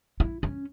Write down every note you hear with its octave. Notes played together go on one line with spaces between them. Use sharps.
E4
C#4